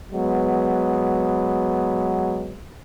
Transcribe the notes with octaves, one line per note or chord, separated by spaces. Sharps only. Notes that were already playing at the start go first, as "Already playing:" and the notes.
F#3 G#3 B3